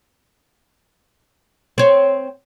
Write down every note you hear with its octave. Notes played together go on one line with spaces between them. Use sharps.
C4 C#5